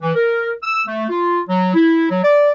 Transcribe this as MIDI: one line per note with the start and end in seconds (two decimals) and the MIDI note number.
0.02 0.15 52
0.15 0.51 70
0.63 0.82 88
0.87 1.05 57
1.10 1.41 65
1.48 1.72 54
1.74 2.09 64
2.10 2.24 54
2.24 2.51 74